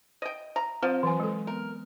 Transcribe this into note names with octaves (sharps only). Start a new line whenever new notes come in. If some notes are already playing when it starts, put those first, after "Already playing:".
D#5 G5
A#5
F3 C4
E3 F#3 G#5
G#3 A4
B3 A#4